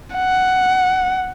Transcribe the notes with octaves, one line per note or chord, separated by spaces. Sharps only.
F#5